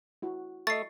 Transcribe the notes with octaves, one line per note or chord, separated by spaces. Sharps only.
E4 F#4
A3 D#5 C#6 A6 C7